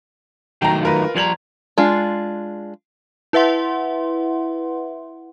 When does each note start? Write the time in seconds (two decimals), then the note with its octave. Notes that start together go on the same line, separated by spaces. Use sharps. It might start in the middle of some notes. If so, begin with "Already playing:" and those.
0.62 D#3 F#3 A3 G5 A#5
0.83 F4 A#4 B4
1.16 F3 G3 A#5 G#6 F#7
1.78 G#3 D4 F4
3.33 E4 B4 E5 F#5 C6